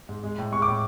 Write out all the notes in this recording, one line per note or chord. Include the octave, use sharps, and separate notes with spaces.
G#2
G#3
A2
G#3 C#6
D6
A2